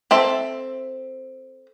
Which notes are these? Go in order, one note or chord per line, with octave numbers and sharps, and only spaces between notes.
C4 A4 E5